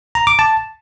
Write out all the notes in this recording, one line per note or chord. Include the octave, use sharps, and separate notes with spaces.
A#5
D6
A5